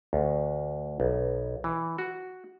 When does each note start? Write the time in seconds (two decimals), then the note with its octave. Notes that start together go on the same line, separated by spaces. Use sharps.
0.13 D2
1.00 B1
1.64 E3
1.98 F#4